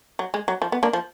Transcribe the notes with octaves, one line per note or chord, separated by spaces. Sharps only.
F#3
G#3
F#3
F3
B3
A#3 D4
F3